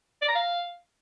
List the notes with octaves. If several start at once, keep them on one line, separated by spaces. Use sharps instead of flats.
D5
A#5
F5